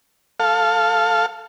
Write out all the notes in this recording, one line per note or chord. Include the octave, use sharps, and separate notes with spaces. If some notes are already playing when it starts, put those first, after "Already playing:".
A4 F5